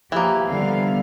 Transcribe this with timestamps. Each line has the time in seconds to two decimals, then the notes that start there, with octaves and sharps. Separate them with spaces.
0.12 E3 F3 A#3 G4
0.49 D3 G3 B3 F5